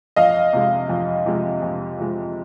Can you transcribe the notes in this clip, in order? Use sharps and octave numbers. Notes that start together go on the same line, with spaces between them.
F2 D#5 F5
C3 F3 G#3
F2
C3 F3 G#3
F2
C3 F3 G#3